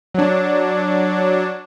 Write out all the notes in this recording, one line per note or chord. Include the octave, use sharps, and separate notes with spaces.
F#3 D4